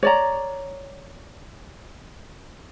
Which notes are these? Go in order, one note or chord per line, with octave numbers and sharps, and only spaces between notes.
C#5 D5 A#5